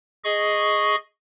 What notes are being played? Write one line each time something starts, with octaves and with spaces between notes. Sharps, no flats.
G#4 D#5 C#6